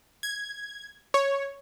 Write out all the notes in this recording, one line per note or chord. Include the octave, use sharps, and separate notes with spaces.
G#6
C#5